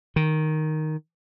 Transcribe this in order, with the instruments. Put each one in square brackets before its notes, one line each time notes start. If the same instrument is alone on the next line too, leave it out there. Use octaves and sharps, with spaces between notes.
[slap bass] D#3